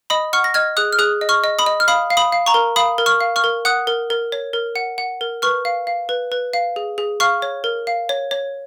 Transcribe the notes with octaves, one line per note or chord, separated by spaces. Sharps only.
D#5 B5 D#6
F#5 C#6 F6
A#6
D#5 F6 G#6
G#4 D#6 F#6
F6
G#4 D#6 F#6
D#5
C#6 F6
D#5
B5 D#6
D#5
F6
F5 B5 D#6
F5
B5 D#6
F5
A#5 C#6
A#4
F5 B5 D#6
A#4
C#6 F6
F5
C#6 F6
A#4
F#5 D#6 F#6
A#4
A#4
C#5
A#4
F#5
F#5
A#4
B4 C#6 F6
F5
F5
B4
B4
F5
G#4
G#4
F5 C#6 F6
C#5
A#4
F5
C#5
C#5